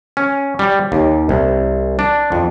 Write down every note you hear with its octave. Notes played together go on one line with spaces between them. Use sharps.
C#4
G3
D#2
C2
D4
F2